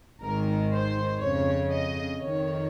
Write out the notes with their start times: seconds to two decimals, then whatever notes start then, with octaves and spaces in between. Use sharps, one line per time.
0.22 G#1 G#2 D#3 A#4
0.71 C5
1.20 F2 C#3 C#5
1.70 D#5
2.19 F2 D#3 C#5